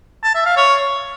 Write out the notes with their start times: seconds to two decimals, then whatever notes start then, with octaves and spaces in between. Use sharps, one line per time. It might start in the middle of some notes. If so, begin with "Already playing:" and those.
0.24 A5
0.35 E5
0.46 F5
0.57 C#5